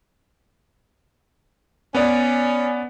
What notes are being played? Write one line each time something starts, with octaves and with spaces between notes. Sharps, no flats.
B3 C#4 D5